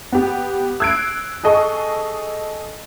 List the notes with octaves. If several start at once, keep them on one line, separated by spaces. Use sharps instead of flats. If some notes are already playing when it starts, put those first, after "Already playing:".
B3 G4
E6 F#6 G#6 C7 D7
G#4 A4 D#5 A5 C#6